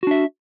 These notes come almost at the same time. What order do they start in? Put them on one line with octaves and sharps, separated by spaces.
F#4 D4 E5